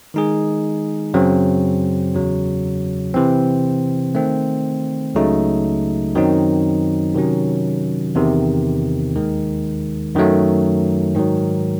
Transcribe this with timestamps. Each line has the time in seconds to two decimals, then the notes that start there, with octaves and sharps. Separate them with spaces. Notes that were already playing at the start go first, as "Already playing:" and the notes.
0.14 D#3 G#3 D#4 G#4
1.14 F#2 C#3 F#3 C4
2.14 E2 C#3 F#3
3.14 C3 E3 C4
4.15 D#3 A3 C4
5.15 C#2 C#3 F#3 A3 D#4
6.15 F#2 D#3 F#3 C4 D#4
7.15 C3 D#3 F#3 C#4
8.15 E2 C3 D#3
9.15 D#2 D#3 G#3
10.15 F#2 D#3 F#3 A3
11.15 G#2 D#3 F#3